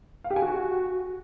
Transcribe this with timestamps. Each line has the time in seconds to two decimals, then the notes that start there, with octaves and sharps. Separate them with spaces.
0.24 F5
0.30 G4
0.36 G#5
0.42 F#4